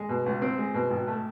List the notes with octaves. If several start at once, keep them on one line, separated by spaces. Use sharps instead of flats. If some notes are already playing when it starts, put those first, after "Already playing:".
Already playing: G#3
B2
C#2
C4
G#3
B2
G#1
A3